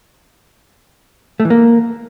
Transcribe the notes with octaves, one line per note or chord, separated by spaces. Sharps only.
A3
E3
A#3